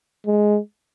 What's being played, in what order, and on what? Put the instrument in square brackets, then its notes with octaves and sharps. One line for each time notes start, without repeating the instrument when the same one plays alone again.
[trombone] G#3